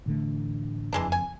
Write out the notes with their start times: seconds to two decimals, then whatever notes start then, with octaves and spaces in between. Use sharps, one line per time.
0.06 A1 D3 A3
0.93 F#1 F2 E3 G#3 D4
1.12 G#5